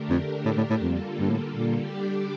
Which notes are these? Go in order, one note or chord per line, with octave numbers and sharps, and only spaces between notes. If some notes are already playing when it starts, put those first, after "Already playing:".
Already playing: D3 A3 D4 G4 A#4
F2
A2
A2
A2
F2 D3 G3 A#3 F4 A4
G2
A2
A#2
D3 G3 D4 G4 D5